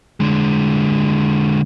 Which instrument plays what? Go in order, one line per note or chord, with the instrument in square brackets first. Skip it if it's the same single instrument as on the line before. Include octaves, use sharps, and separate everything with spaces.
[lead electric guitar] D3 G#3